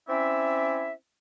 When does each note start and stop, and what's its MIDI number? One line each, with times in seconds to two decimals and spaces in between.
0.08 0.92 60
0.08 0.92 61
0.08 0.92 64
0.08 0.92 74
0.08 0.92 76